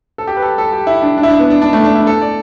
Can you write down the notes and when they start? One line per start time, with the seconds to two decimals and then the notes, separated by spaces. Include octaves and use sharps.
0.18 A4
0.27 G4
0.37 B4
0.42 A4
0.58 A4
0.73 G4
0.87 E4
1.02 D4
1.18 D4
1.23 E4
1.28 D4
1.39 B3
1.50 D4
1.61 D4
1.73 A3
1.84 D4
1.95 E4
2.07 A4
2.22 D5